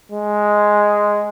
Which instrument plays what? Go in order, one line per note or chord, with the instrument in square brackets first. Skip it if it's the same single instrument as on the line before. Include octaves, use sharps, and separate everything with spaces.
[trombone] G#3